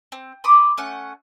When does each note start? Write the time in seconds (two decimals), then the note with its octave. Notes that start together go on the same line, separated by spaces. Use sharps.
0.12 C4
0.44 B5 C6 D6 D#6
0.77 A3 C#4 F#5